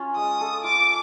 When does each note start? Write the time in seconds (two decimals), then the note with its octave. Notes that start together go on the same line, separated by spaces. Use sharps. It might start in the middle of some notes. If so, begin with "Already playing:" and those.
Already playing: C#4 F4
0.16 G#3 D#6
0.41 A4
0.64 F4 D6